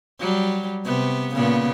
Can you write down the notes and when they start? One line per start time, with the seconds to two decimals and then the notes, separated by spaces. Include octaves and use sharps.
0.20 F#3 G3
0.85 C3 B3
1.35 A#2 C#3 B3